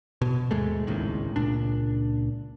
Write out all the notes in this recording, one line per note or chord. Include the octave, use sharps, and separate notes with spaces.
B2
D#2 G#2 G#3 A3
G#1 C#2 A2 D#3
C#2 A#2 D4